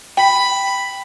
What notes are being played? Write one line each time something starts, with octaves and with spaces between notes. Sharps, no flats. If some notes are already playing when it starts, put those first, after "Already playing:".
G5 B5